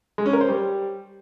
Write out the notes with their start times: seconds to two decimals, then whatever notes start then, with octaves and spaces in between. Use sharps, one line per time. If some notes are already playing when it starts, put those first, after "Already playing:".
0.18 G#3
0.26 C#4
0.33 A#4
0.41 C5
0.48 G3